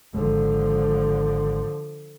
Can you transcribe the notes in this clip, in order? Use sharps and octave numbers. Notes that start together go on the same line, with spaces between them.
G#1 D#2 D3 F3 G#3